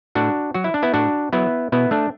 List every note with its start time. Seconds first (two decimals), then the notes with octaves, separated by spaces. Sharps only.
0.15 A2 D4 F#4
0.54 F#3 F#4
0.64 E4
0.74 D4
0.82 B3 E4
0.94 A2 D4 F#4
1.33 F#3 B3 E4
1.72 B2 B3 E4
1.91 A3 D4